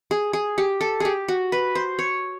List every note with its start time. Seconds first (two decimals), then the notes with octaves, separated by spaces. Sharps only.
0.11 G#4
0.33 G#4
0.58 G4
0.81 A4
1.00 G4 G#4
1.28 F#4
1.52 B4
1.75 C5
1.99 C#5